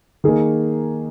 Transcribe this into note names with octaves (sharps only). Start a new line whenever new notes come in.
D#3 A#3 G#4